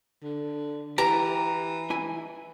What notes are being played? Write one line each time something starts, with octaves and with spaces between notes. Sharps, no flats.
D3
E3 G4 A#5
E4 G#5